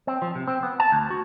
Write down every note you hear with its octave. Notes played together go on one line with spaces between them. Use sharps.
C4
F3
C3
C4
B3
A5
D2
F#4